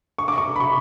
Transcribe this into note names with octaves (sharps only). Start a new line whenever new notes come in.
C#6
D6
C#6
B5
C#6